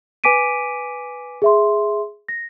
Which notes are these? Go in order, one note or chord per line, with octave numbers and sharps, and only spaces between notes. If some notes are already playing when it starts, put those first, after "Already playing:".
B4 G#5 D6 B6 D7 D#7
G#4 E5 C6
A#6